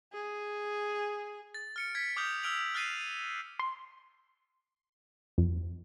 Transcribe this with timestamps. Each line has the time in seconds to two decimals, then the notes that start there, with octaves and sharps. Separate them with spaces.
0.13 G#4
1.54 A6
1.76 F6 C#7 D7
1.95 G#6 B6 C#7
2.16 D6 D#6 F6 G6 F7
2.43 E6 F6 D7 F7 F#7
2.74 F6 F#6 A6 C7 D#7
3.59 C6
5.38 F2